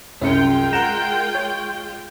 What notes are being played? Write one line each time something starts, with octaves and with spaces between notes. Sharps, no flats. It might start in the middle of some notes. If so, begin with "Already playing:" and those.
C2 F#2 G#3 C#4 F4 G5 C#7
A#4 F#5 A#5 E7
C#5